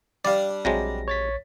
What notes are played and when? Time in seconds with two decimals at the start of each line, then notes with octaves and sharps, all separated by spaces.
0.25 G3 D4 D5 F5
0.65 A#1 C3 F#3 G#3 A#6
1.08 C#5 A6 B6